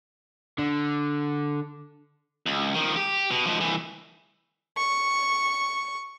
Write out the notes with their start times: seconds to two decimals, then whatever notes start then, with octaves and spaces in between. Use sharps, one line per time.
0.59 D3
2.46 C#2
2.75 D#3 F3
2.96 G4
3.31 B2
3.46 G#2 F3
3.60 C2 E3
4.77 C#6